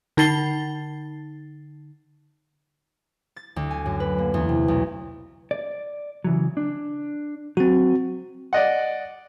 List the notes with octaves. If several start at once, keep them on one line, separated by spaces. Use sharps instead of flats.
D3 D#4 A5 A6 C7 G7
A6
D2
G#5
F#2
B4
A#3
E2
C3
B1
D5
C#3 E3 F#3
D4
F#3 C4 F#4
D5 D#5 F#5